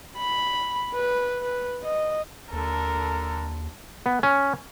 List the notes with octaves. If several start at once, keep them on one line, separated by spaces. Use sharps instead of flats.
B5
B4
B4
D#5
D#2 D3 A4 A#4
B3
C#4